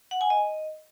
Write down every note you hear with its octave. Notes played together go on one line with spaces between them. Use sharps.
F#5
G#5
D#5